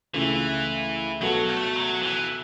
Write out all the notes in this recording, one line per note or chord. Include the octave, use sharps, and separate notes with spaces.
C#2 C#3 E3 A3 E4
B2 F#3 B3 F#4 A4
A3
F#3
E3